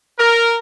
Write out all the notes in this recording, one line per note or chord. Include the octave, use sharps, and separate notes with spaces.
A#4